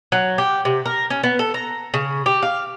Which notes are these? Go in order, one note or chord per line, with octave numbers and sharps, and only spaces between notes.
F#3
G4
C3
A#4
C#4
B3
A4
A#5
C#3
G4
F5